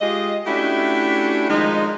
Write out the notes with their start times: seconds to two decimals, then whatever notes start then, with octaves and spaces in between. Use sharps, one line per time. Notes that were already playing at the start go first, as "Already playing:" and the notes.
0.01 G#3 F4 G4 D#5
0.46 A3 C#4 D4 E4 F#4 G4
1.50 D#3 F3 G#3 D#4